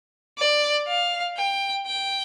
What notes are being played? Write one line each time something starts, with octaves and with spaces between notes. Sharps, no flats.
D5
F5
G5
G5